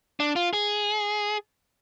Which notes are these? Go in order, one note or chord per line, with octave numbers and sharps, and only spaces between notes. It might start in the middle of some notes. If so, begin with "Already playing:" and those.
D4
F4
G#4